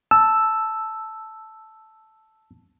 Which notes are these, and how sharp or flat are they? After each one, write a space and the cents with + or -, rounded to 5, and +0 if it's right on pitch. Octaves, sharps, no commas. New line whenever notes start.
A5 -5 E6 +0